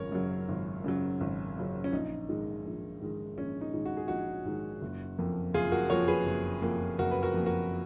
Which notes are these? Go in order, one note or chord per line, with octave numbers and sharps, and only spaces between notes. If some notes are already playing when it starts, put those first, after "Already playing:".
Already playing: G#1 F#2 C#3 F#3 A#4 C#5
F#2 C#3 F#3
G#1
F#2 C#3 F#3
G#1
F#2 C#3 F#3
C#4
A#1 D#4
G#2 D#3 G#3
A#1
G#2 D#3 G#3
A#1 C#4
D#4
G#2 D#3 G#3
F#4
G#4
A#1 D#4 F#4
G#2 D#3 G#3
F#1
F2 F3 A#3
F#1 F4 G#4
F#4 A#4
F2 F3 A#3 A#4 C#5
G#4 B4
F#1
F2 F3 A#3
F#1 F#4 A#4
B4
F#4 A#4
F2 F3 A#3
F#4 A#4